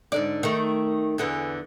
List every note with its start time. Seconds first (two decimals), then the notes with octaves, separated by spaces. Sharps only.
0.12 G#2 D3 D5
0.43 D#3 A3
1.18 E2 D3 E3